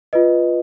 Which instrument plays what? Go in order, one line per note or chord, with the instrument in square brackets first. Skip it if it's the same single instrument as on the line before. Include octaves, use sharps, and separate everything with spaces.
[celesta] F4 B4 D#5